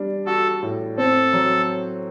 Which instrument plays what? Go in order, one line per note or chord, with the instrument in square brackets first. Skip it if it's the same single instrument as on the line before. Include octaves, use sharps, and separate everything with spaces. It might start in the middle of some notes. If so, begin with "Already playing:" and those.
Already playing: [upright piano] G3 D4
[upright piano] F#4 [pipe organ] A4
[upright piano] A2
[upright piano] C4 [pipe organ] A4
[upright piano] F#3